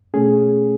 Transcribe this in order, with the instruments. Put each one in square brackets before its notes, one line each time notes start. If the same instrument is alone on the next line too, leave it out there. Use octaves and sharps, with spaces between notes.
[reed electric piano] B2 A3 C#4 G#4